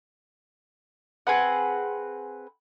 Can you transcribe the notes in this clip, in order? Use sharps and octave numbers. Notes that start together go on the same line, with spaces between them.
C4 G#4 B4 F#5